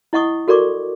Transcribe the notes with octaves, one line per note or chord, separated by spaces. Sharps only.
E4 D#5 F#5 C#6 D#6
F#4 A4 A#4 D5 C#6 D6